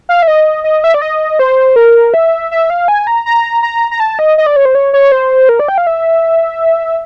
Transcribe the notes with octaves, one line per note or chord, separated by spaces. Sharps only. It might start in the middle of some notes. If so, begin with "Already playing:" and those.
F5
E5
D#5
D#5
E5
D5
D#5
C5
A#4
E5
E5
F5
G#5
A#5
A#5
A#5
A#5
A5
D#5
D#5
D5
C#5
C5
C#5
C#5
C5
A#4
D5
G5
F5
E5